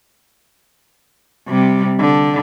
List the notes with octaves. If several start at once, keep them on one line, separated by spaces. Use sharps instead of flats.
C3 G3
D3